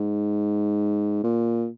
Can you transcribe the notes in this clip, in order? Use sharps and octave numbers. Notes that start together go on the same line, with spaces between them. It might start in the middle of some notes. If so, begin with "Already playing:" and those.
Already playing: G#2
A#2